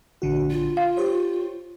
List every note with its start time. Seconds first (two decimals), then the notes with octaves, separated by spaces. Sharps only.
0.22 A#1 D3 F#4
0.51 F4
0.77 F5
0.97 G4 C5 C#5